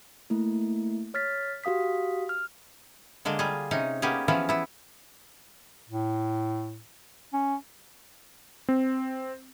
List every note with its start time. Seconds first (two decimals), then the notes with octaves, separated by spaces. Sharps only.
0.30 A3 A#3 E4
1.14 C#5 F6 A6 B6
1.64 F#4 G4 F5 D#6 B6
2.29 F6
3.25 D3 G#3 A#3 D4
3.39 G3 F4 G#4
3.71 C3 C#4 D#4
4.02 A#3 B3 C#4 G4 G#4
4.28 E3 F3 B3 C#4 F4
4.49 B3 E4
5.90 A2
7.33 C#4
8.69 C4